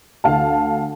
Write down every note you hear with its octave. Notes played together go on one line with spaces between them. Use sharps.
D2 F5 A5